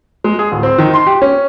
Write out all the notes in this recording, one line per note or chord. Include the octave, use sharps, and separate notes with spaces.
G#3
G#4
D1
C4
D#3
C6
G4
C#4